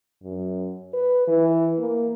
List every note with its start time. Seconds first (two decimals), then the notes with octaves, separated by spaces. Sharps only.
0.23 F#2
0.93 B4
1.27 E3
1.79 A#3